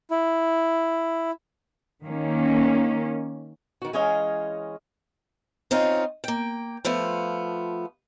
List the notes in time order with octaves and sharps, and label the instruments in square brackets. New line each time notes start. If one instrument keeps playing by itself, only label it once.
[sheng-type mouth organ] E4
[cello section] D#3 A#3 C#4
[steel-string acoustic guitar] D#3 F#4
E3 G#3 C#4 C#5 D#5 F5
C4 C#4 D#4 F4
A#3 G5
F3 A3 B3 F4